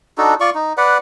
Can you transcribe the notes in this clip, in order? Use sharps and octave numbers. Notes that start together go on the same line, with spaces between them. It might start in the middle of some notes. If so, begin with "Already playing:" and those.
D4 D#4 F#4 A4
F4 D5 C#6
D#4
B4 D5 F#5